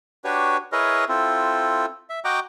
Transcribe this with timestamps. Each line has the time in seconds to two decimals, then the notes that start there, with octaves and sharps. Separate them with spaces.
0.24 D4 F#4 G4 B4 C#5
0.72 E4 G#4 A#4 B4 C#5 D#5
1.09 C4 E4 F4 A4
2.10 E5
2.25 F#4 D#5 F#5 G5 A#5 D6